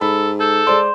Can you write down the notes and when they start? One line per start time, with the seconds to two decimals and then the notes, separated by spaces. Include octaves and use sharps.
0.01 G#2 A4 B5
0.40 A4 G6 E7
0.67 G#3 C5 D5 C6